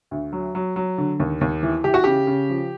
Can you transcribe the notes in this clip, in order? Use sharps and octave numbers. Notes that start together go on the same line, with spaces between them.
D2
F#3
F#3
F#3
D3
D#2
D#2
E3
E3 G4
F#4
C#3 G4
C#3
F3